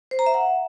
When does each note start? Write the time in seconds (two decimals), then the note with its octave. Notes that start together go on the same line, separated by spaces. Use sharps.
0.11 C5
0.19 A#5
0.26 E5
0.34 F#5